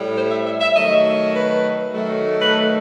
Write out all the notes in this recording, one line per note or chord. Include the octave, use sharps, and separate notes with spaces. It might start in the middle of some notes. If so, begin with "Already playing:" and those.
Already playing: A2 G3
C5
E5
E5
E5
D#3 F#3 A3 D#5
B4
D#3 F#3 A3
B4
A4